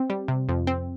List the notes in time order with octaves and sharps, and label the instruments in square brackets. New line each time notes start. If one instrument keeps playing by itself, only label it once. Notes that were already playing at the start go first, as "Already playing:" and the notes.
Already playing: [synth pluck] C4
G3
C3
F2
C4